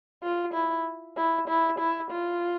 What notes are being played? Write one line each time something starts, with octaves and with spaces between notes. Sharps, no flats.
F4
E4
E4
E4
E4
F4